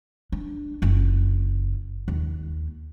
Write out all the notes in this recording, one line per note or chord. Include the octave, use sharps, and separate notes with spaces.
D4
F#1 F4
D#2